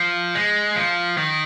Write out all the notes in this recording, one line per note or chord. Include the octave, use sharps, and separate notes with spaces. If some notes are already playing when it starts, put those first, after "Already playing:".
Already playing: F3
G#3
F3
D#3